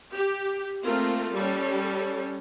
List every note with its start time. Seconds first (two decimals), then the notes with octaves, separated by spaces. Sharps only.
0.14 G4
0.86 A3 A#3 C4 F4 A#4
1.35 G3 C#4 A4